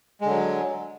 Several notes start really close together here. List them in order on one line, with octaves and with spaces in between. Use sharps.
G#3 D3 F#3